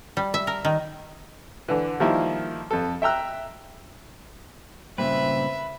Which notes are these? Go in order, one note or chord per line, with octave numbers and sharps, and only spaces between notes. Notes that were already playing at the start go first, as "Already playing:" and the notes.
G3
E5
A#4
D#3
D3 E3
D#3 F3 G3 A#3 E4
F2 A4
E5 G5 A#5 E6 F#6
G2 A#2 C#3 C4 B4 E5